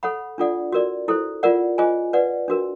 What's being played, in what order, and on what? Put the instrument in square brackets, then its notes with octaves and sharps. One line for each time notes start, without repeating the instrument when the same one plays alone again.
[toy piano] A4 C#5 F#5 B5
D4 F4 A4 D5 F#5
F#4 A#4 D5
E4 A4 C5
F4 A#4 D5 F#5
F4 G#4 C5 D#5 G#5
B4 D5 F#5
D4 F#4 A#4